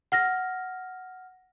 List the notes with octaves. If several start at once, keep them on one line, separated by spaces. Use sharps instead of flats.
F#5 F6 A#6